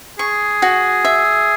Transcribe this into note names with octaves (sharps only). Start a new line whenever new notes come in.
G#4 C#6
F#4
E5